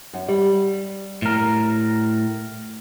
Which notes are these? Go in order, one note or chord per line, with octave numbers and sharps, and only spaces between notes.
F#2
G3
A2 A#4